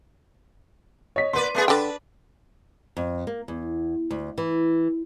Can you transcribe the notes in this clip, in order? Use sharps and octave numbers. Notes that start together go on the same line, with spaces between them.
C#5 D#5 B6
A#3 B4 D5 C6 D#7
A3 B3 G#4
D3 D4 B4 D5 G5
F2
A#3
E2
D2
E3